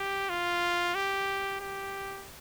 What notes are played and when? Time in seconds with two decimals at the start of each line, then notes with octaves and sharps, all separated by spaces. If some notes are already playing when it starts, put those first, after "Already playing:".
Already playing: G4
0.29 F4
0.95 G4
1.60 G4